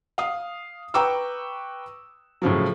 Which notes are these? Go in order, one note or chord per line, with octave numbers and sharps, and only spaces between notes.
F5 D#6
B4 G5 A#5 C#6 D6 E6
A2 C#3 F3 F#3